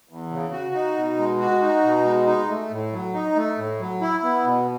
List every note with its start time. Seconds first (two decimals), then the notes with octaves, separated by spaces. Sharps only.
0.09 E2
0.31 C#3
0.52 F#4
0.75 D#4
0.96 B2
1.18 G#3
1.40 F#4
1.61 D#4
1.83 B2
2.05 G#3
2.27 D#4
2.48 A3
2.71 A2
2.93 F#3
3.14 D#4
3.36 A3
3.58 A2
3.80 F#3
4.02 E4
4.23 B3
4.45 B2